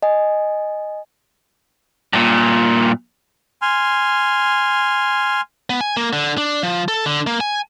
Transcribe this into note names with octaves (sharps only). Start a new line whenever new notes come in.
D#5 G#5
G2 A#2
G#5 C6 F6
B3
G#5
A#3
D3
D4
F3
A4
D3
A#3
G#5